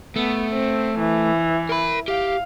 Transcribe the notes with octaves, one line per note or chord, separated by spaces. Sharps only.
A3 B3
C4
E3
A#4 B5
G4 F5